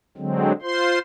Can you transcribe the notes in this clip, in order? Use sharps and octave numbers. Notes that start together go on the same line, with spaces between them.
D3 F#3 G#3 C4
F4 C5 C6